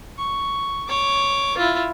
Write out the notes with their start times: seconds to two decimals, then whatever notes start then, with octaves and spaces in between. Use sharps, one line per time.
0.18 C#6
0.89 C#5 D6
1.58 E4 F4